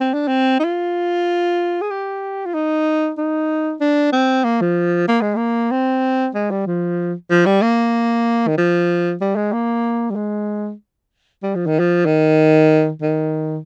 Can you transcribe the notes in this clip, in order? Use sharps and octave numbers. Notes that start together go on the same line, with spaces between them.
C4
D4
C4
D#4
F4
G#4
G4
F4
D#4
D#4
D4
C4
A#3
F3
A#3
G#3
A#3
C4
G#3
G3
F3
F3
G3
A#3
D#3
F3
G3
G#3
A#3
G3
G#3
G3
F3
D#3
F3
D#3
D#3